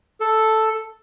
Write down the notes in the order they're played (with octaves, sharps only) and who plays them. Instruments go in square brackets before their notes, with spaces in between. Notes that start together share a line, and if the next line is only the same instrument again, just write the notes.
[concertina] A4